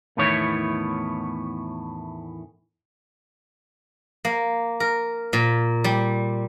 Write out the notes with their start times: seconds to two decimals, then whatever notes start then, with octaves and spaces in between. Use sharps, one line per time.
0.17 E2 A2 D#3 B3 E4 C#5
4.25 A#3
4.80 A#4
5.33 A#2
5.84 G3